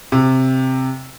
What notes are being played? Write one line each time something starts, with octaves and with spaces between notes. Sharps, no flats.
C3